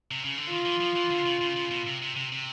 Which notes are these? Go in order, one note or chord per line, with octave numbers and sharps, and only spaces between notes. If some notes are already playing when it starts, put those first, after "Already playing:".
C3
C#3
D3
D#3 F4
E3
F3
E3
D3
C#3
C#3
C#3
B2
C3
C3
C3
C3